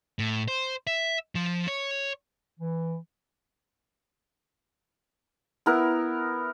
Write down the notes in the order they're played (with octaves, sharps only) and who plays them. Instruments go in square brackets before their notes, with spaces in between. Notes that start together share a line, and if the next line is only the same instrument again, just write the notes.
[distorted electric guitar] A2
C5
E5
F3
C#5
[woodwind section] E3
[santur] B3 E4 A#4